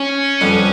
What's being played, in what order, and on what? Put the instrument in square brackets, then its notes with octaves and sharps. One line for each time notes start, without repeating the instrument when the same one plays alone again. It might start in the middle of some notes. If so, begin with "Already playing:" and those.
Already playing: [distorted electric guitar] C#4
[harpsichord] F2 D3 G3 B3 D4